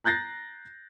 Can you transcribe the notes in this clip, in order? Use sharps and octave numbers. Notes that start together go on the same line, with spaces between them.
A#5 F#6 G6 A6 A#6 C7